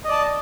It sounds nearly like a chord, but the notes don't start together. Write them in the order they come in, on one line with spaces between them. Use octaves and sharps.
D#5 D5 A5